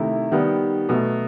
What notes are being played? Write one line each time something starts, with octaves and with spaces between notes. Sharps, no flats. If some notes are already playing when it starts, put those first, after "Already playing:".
Already playing: C3 D#3 A3 E4
D#3 G3 B3
B2 F#3 A3